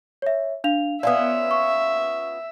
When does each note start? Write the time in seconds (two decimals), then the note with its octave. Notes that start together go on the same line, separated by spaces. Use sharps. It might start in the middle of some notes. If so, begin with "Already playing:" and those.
0.22 C#5 E5
0.64 D4 F5 F7
1.03 B3 C#4 F4 D5 E5
1.51 C#6